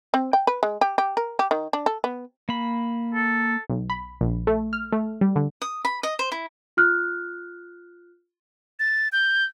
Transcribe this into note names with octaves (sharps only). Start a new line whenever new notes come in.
C4
G5
B4
G#3
G4
G4
A#4
G4
D#3
D4
A4
B3
A#3 B5
A4
B1
B5
A#1
A3
F6
A3
G3
D3
D#6
B5
D#5
C5
E4
F4 F6 F#6
A6
G6